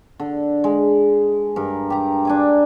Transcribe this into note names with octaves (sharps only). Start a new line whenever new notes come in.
D3
G#3
G2 A#4
G4 A#5
D4 G#5 D6